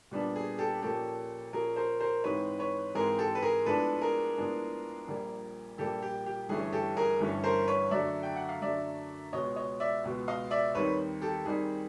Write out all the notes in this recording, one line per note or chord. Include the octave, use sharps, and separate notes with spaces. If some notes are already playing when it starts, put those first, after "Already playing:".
A#2 G3 B3 D4
G#4
G4 A4
A#2 F3 A#3 C#4 G4 A4
A#2 F3 A#3 C#4 G#4 A#4
A#4 C5
A#4 C5
G#2 E3 G#3 C4 D#4 B4 C#5
B4 C#5
G#2 E3 G#3 C4 D#4 G#4 A#4
G4 A4
B4
G#4 A#4
A2 F3 G#3 B3 D4 A4 B4
G#4 A#4
A2 F3 G#3 B3 D4
A#1 A#2 G3 A#3
A#1 A#2 G3 A#3 G4 A4
G4
G4
G1 G2 E3 A3 C#4 G#4
G4 A4
G#4 A#4
G1 G2 E3 A3 C#4
A#4 C5
B4 C#5
F#2 D3 F#3 A3 D5 E5
G5
F#5
F5
F#2 D3 F#3 A3 D5 E5
C#2 B2 G#3 B3 C#5 D#5
C#5 D#5
D5 E5
C#2 B2 G#3 B3
D#5 F5
D5 E5
D#2 D#3 G3 C4 D#4 B4 C#5
G4 A4
D#2 D#3 G3 C4 D#4 G#4